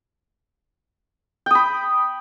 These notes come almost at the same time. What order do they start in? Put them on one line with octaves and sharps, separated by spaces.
G5 D#6 B5